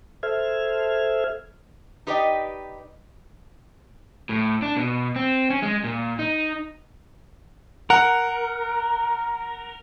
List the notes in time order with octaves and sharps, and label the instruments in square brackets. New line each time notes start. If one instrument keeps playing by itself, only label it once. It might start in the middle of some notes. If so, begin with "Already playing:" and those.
[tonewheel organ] A4 C5 E5 F6 G#6
[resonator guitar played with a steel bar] D#4 G4 B4 D5 D#5 G5
[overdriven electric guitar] A2
D4
B2
C4
C#4
G#3
A#2
D#4
[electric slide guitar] A#4 [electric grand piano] F#5